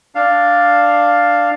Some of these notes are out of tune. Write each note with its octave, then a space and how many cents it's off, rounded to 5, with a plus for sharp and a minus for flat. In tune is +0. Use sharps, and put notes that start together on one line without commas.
D4 +0 F5 +0